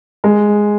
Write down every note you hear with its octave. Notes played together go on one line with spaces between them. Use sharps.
G#3